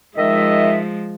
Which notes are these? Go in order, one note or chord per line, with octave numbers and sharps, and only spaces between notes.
D#3 F3 G#3 D#5 E5